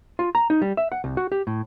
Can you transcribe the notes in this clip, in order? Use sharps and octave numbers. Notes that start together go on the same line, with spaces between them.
F4
A#5
D#4
G3
E5
F#5
C2
F#4
G4
A2